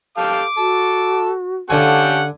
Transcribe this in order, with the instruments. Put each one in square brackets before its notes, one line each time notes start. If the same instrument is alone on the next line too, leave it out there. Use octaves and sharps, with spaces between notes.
[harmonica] G4 A4 F5 [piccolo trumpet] D6
[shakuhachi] F#4 [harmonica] A4
[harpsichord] D3 G#5 [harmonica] C#4 G4 A4 [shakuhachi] F5 [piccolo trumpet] F#5